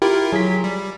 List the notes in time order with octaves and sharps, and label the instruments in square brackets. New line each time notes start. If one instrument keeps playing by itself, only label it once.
[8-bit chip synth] E4 F4 A#4 [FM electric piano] G4
[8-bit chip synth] F#3 [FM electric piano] G#4 B6
[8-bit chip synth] G3